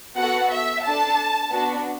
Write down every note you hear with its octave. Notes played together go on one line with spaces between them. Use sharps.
B3 F#4 A4 F#5
E5
D4 A4 A5
B3 D4 F#4